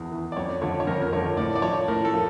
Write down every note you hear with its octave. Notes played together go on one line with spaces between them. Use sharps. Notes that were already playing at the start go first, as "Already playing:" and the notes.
Already playing: E2
E3
D5
F2 C#5
D3 F3 C#5
C#5
F2 A#4
A#4
D3 F3 C#5
A2 D5
D5
F3 C#5
A2 A#4
A4
F3